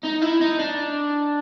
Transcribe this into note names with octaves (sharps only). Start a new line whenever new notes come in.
D#4
E4
D#4
D4